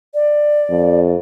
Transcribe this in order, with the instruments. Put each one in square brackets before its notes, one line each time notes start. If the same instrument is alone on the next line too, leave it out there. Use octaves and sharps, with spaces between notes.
[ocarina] D5
[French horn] F2